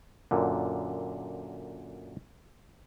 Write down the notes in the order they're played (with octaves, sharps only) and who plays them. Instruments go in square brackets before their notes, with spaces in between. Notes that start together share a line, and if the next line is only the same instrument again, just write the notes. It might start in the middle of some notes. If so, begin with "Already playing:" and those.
[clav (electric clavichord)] F#2 A#2 D3